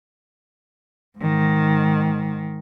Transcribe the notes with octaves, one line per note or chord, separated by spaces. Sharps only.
G#2 D#3